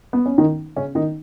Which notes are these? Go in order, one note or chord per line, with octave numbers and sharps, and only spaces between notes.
B3
C#4
D#3 D#4
C#3 C#4
D#3 D#4